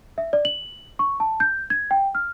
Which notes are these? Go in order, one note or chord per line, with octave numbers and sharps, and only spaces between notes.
E5
D5
F#7
C#6
A5
G6
G#6
G5
F6